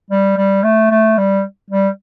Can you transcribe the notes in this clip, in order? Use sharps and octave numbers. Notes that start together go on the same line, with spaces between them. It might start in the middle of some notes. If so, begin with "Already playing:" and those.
G3
G3
A3
A3
G3
G3